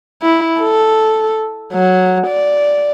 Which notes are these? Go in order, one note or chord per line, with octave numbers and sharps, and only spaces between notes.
E4
A4
F#3
D5